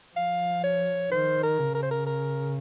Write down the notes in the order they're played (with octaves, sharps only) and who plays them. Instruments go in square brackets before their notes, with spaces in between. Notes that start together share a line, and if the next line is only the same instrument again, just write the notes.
[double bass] F3 [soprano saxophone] F5
[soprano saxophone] C#5
[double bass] D#3 [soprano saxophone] C5
[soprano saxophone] A#4
[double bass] C#3
[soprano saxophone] A#4
C5
A#4
A#4